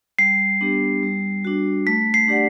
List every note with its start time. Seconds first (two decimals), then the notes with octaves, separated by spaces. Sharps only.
0.19 G3 C7
0.61 B3 D4 G4
1.03 G3
1.45 D4 F#4
1.87 A3 B6
2.14 C7
2.28 D4 G4 D5 F#5